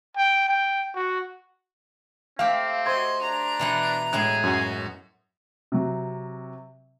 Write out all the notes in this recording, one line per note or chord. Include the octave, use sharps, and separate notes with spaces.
G5
G5
F#4
A3 C4 G4 F5
F#4 C5 D#5 C6 G#6
D4 A#5
B2 E3 F#5
A2 G#3 G#4 G#5 F#6
F#2 C#4 F#4
C3 F#3